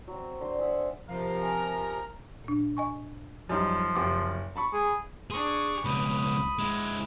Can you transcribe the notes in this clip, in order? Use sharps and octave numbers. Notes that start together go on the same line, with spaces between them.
F#3 C4
D3 C4 C6
G#4 E5 F#5
C3 F3 A#4 F5
G#5 A#5
A#2 D4
D#5 G#5 C#6
F#2 F3 G3 D#4
F#1 C3 D6
A5 B5 C#6
G#4
D4 G#4 C#6
C#2 B2 B5 D#6
G#3 E4